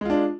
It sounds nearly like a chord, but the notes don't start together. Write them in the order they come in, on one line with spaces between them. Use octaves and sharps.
G#3 F4 D4